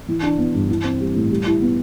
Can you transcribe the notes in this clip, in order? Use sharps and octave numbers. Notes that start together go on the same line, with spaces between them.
E3
D4
B3
G2
E3
C4
G3
A2
G3
E4
B3